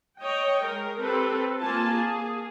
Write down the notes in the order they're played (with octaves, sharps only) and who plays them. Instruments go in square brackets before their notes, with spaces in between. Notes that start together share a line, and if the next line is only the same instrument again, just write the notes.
[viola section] C#5 D#5 G5
G#3 A#4
C4 G4 A4 B4
A#3 F4 G#5 A5
G#4